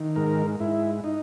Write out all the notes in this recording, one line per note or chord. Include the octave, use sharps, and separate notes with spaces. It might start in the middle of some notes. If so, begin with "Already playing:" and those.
Already playing: D#3
G#2 A#4
G#2 E4
D#4